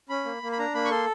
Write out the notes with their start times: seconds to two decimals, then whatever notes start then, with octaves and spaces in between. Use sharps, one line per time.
0.09 C#4 B5
0.25 A#3
0.43 A#3
0.52 B5
0.59 D4 A#5
0.74 A#3 B5
0.85 C#6
0.91 A4 C6